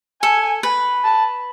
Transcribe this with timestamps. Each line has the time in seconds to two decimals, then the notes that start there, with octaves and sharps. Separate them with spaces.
0.22 A4 G#5
0.63 B4
1.04 A5